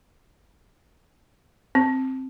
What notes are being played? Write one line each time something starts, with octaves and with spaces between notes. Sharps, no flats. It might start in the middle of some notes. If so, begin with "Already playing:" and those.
C4